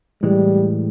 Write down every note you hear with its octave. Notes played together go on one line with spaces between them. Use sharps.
A2 E3 G3 G#3